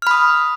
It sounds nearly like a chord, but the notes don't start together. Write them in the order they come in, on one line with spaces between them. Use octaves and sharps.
F6 B5 D#6